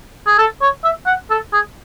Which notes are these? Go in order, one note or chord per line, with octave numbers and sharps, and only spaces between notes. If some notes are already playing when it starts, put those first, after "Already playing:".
G#4
A4
C#5
E5
F#5
A4
G#4